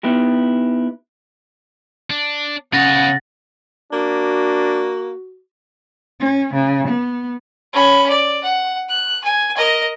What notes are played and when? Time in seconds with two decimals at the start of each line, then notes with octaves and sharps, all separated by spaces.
0.03 B3 D#4 E4 G4
2.10 D4
2.73 C#3 B3 C#5 F#5 A6 A#6
3.93 A#3 D4 F#4
6.20 C#4
6.54 C#3
6.88 B3
7.73 C#4 B5
8.09 D5
8.43 F#5
8.89 F#6
9.24 G#5
9.57 A#4 D#5